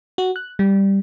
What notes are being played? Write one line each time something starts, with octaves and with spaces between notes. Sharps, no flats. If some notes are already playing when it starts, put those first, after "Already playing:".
F#4
F#6
G3